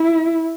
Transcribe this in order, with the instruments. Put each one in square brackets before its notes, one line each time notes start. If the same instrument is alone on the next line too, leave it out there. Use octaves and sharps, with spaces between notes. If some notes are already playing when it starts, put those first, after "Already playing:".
Already playing: [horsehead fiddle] E4